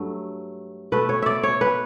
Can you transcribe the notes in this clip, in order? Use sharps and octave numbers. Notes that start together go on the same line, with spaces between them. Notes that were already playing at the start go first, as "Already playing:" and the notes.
Already playing: G2 F#3 A3
B2 A3 B4
C#5
D5 E5
C#5
B4